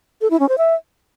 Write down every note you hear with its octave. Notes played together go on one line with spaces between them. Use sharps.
A4
E4
C#4
C5
E5